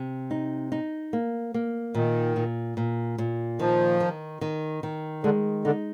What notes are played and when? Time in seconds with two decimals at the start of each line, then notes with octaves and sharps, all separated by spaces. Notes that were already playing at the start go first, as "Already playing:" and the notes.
Already playing: C3
0.31 D#4
0.72 D#4
1.13 A#3
1.54 A#3
1.95 A#2 D#3
2.36 A#2
2.77 A#2
3.18 A#2
3.59 D#3 F3
4.00 D#3
4.41 D#3
4.83 D#3
5.23 D3 G#3
5.65 D3 D#4